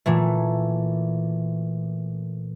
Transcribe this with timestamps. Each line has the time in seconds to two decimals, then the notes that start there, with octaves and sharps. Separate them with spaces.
0.06 A#2 E3 A3